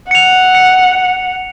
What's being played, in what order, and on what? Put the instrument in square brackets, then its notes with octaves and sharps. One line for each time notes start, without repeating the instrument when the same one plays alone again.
[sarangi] F#5 [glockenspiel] C#7 F7
[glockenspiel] C#7